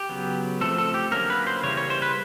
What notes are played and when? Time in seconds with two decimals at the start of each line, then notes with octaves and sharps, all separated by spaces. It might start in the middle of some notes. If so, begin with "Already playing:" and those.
Already playing: G4
0.09 C#3 F#3 B3
0.61 F3 A3 C4 A4
0.78 A4
0.94 G4
1.11 D3 F#3 A#3 C#4 A#4
1.30 B4
1.47 C5
1.64 C#3 E3 G3 A#3 C#5
1.77 C#5
1.90 C5
2.02 B4